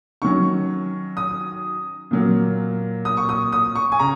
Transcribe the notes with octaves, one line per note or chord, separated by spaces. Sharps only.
D#3 F#3 C#4 C#6
D#6
A#2 F#3 A#3
D#6
C#6
D#6
D#6
C#6
G#5
C#3 A#5